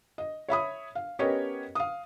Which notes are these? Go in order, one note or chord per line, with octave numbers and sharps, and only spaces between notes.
D#5
C#5 E5 B5 D#6
F5
B3 C#4 G4 A#4 C#5 D#5
F5 D#6